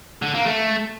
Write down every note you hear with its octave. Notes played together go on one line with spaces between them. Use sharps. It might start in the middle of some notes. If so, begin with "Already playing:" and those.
D3
A#3
A3